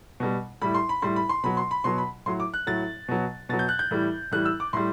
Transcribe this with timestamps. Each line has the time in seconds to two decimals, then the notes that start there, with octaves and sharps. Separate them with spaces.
0.20 B2 G3
0.62 A2 G3 B5
0.75 C6
0.89 B5
1.02 A2 G3 C6
1.16 B5
1.29 C6
1.44 B2 F#3 B5
1.57 C6
1.71 B5
1.84 B2 F#3 C6
1.98 B5
2.26 A2 F#3 C6
2.40 D6
2.54 F#6
2.67 A2 F#3 A6
3.08 B2 F#3
3.49 B2 F#3 A6
3.59 G6
3.69 F#6
3.79 G6
3.91 A2 E3 G3
4.31 A2 E3 G3 F#6
4.45 E6
4.60 D6
4.73 A2 G3 C6